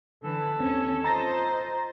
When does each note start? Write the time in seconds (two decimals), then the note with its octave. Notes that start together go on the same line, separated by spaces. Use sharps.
0.24 D3 E3 A4 B4
0.60 D#2 C4 C#4
1.04 F4 C5 D#5 A#5 A6 A#6